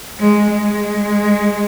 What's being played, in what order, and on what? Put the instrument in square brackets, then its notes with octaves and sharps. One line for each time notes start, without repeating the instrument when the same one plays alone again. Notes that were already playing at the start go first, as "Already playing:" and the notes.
[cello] G#3
G#3